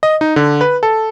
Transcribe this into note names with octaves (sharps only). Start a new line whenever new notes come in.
D#5
D#4
D3
B4
A4